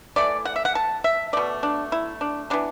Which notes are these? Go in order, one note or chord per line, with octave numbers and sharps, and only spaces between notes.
E3 A3 D5
F#5
E5
F#5
A5
E5
B2 A3 D5
D4
E4
D4
E3 B3 D4